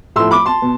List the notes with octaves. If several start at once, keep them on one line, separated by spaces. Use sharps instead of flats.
A2 F3 A3 C6 E6
B5 D6
A5 C6
B2